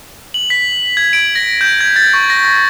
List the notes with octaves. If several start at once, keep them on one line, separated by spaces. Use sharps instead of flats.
F#7
B6
G#6
D7
A#6
G6
G#6
A6
C#6
A#6